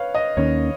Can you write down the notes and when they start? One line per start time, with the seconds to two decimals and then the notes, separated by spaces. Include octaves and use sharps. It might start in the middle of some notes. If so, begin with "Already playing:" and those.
Already playing: B4 C#5 F5
0.15 D#5
0.37 D#2 D#3 A#3 C#4 C#5